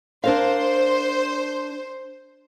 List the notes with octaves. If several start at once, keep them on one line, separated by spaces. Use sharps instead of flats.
D4 A#4 C5 F5